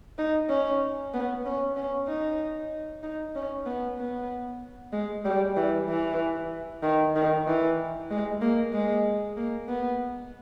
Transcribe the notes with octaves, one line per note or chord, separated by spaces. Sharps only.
D#4
C#4
B3
C#4
C#4
D#4
D#4
C#4
B3
B3
G#3
G3
E3
E3
D#3
D#3
E3
G#3
A#3
G#3
A#3
B3